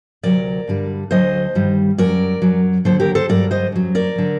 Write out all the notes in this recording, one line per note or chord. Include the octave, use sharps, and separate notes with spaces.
D2 C3 F#3 A#4 D5
G2 D3 G3
D2 D3 F#3 C5 D#5
G2 D#3 G3
F#2 F#3 A#4 D5
F#2 F#3
D#2 D3 F#3 A4 C5
G4 A#4
A4 C5
G2 F#3 A#4 D5
C5 D#5
F#2 F#3
A#4 D5
D3 F#3